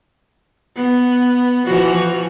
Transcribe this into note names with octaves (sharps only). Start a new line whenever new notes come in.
B3
E3 F3 F#4